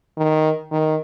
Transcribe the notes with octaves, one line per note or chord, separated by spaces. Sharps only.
D#3
D#3